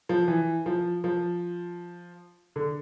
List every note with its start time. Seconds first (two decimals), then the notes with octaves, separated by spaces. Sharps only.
0.09 F3
0.28 E3
0.66 F3
1.04 F3
2.56 D3